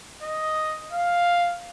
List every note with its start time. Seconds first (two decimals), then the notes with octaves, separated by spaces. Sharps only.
0.23 D#5
0.91 F5